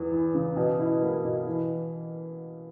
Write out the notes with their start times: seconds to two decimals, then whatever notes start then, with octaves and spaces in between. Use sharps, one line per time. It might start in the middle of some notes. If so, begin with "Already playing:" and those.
Already playing: E2 E3
0.11 E3
0.34 C#3
0.56 B2
0.79 E4
1.02 A#3
1.25 B2
1.47 E3